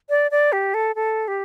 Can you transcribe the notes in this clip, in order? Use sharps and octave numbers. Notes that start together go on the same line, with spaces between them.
D5
D5
G4
A4
A4
G4